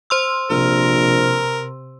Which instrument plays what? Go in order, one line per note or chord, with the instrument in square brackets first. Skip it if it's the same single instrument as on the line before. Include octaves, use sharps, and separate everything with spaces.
[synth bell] C5 C6 E6
[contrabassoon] A#1 [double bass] C3 [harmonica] A#4